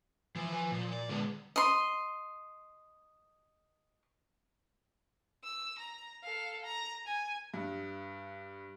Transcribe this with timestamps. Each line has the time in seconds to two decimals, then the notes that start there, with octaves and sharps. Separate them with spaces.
0.36 E3 F3
0.52 B4 G#5
0.71 A#2
0.92 D5
1.09 D3 G#3 B3
1.56 D#5 C6
5.44 E6
5.78 A#5
6.23 A4 F5
6.64 A#5
7.07 G#5
7.54 G2